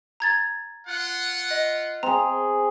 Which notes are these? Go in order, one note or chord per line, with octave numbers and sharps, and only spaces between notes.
A#5 G#6 A6
F4 F#5
D#5
C4 G#4 A#5